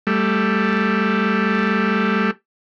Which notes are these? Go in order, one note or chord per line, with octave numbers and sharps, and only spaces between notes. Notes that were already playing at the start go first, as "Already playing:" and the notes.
G3 A3